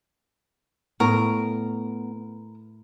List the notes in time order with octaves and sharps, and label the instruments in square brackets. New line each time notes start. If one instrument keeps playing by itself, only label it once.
[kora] A2 [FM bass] B3 [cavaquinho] A#4